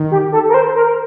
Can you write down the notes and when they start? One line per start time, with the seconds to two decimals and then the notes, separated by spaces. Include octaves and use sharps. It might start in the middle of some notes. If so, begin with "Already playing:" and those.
Already playing: D#3
0.11 G4
0.32 A4
0.49 A#4
0.54 C5
0.75 A#4